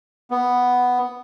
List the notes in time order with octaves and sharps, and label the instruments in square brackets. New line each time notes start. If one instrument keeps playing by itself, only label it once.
[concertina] B3